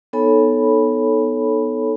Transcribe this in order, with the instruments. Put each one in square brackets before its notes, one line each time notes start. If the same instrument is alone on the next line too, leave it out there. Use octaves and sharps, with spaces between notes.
[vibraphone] B3 D#4 A4 C#5 G#5 B5